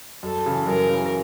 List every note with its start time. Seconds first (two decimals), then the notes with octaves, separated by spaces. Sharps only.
0.23 F#2 A4
0.46 C#3 E3
0.67 F#2 A#4
0.89 C#3 E3